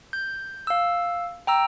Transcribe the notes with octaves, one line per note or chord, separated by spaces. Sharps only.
G6
F5 E6
G5 A#5 E6